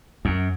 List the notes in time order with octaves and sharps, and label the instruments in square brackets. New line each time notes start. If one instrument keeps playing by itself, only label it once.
[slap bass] F#2